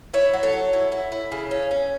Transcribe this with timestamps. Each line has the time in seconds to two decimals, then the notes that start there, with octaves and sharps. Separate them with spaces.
0.14 E4 C#5 E5
0.33 F#3
0.43 A4 C#5
0.53 F#3
0.73 E4
0.92 E4
1.12 E4
1.32 C#3
1.51 C#4
1.71 C#4